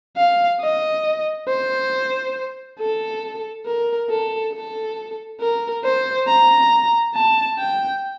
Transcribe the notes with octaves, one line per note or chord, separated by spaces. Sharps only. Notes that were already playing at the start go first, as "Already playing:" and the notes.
F5
D#5
C5
A4
A#4
A4
A4
A#4
C5
A#5
A5
G5